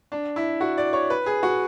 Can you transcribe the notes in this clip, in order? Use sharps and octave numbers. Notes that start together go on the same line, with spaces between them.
D4
E4
F#4
D5
C#5
B4
G#4
F#4